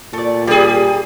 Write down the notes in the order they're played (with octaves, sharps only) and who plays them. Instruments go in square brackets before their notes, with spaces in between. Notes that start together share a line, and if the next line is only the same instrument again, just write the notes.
[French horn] A#2 [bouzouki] A3 D5
[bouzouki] G3 [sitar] G4 G#4